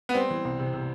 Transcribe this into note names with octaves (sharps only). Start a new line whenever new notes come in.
B3
G3 C4
E3
C2
C3
C3